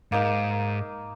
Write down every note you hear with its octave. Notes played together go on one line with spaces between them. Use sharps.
G#2 A#3 D#4